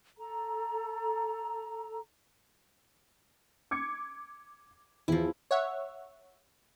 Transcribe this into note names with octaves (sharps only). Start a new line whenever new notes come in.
A4 A#5
D6 G#6 C#7
E2 F3 E4
C#5 E5 F#5